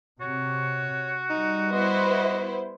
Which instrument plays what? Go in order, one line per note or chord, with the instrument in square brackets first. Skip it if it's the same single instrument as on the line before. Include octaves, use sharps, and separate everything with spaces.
[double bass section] C3 [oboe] F#4 [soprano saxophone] C#5
[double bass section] G3 [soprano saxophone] D#4
[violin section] B3 E4 C5 [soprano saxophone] D#5